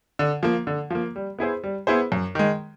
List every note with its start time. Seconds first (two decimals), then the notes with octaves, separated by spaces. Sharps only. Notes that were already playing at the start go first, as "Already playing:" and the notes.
0.19 D3
0.43 F3 A#3
0.67 D3
0.90 F3 A#3
1.16 G3
1.39 B3 E4 G#4 C5
1.63 G3
1.87 B3 E4 G#4 C5
2.12 F#2
2.35 D#3 G#3